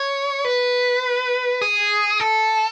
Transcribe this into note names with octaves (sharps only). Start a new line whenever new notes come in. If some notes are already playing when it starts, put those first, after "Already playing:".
Already playing: C#5
B4
G#4
A4